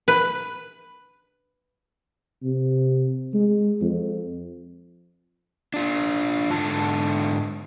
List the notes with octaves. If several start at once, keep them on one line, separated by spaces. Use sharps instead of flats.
B4
C3
G#3
F2
D4 F4
G#2 D3 A5